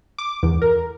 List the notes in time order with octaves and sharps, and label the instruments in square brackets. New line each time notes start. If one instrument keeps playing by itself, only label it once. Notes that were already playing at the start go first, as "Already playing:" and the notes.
[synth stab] D6
E2
A#4